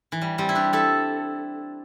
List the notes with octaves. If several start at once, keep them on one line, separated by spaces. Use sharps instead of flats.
E3
G3
G3 C4
E4
D4 G4
E4 A4